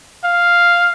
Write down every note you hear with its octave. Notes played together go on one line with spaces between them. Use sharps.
F5